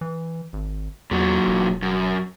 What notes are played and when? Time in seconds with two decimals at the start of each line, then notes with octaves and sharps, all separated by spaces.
0.01 E3
0.53 G#1
1.11 E2 A#2 F#3
1.47 E1
1.82 F#2